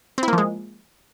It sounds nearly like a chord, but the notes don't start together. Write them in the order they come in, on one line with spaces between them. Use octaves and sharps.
C4 E4 A#3 F3 G#3